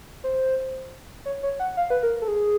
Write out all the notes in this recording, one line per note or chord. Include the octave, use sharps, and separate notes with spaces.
C5
C#5
C#5
F#5
F5
B4
A#4
A4
G#4